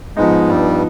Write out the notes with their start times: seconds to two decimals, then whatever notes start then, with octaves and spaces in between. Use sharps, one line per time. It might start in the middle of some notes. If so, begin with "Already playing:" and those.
0.17 G#2 F3 G#3 B3 D#4
0.49 G2 G3